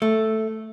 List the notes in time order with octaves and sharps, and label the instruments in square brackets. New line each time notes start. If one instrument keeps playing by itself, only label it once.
[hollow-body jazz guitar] A3